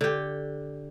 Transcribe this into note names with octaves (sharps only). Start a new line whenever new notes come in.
D3 G4